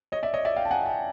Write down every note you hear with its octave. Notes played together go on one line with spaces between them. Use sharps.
C#5 D#5
D5 E5
C#5 D#5
D5 E5
F5 G5
A5
F#5 G#5
G5 A5